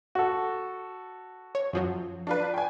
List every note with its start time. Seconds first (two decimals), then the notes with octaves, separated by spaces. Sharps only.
0.15 F#4 A4
1.55 C#5
1.73 F#2 F3 F#3
2.27 D4 F4 B4
2.54 G5 G#5